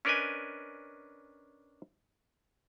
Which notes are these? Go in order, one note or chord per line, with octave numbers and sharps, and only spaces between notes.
C#4 D4 A#4 B4 D#5 G#5